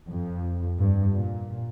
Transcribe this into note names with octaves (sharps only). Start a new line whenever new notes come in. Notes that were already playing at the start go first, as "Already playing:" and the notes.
F2
G2
A#2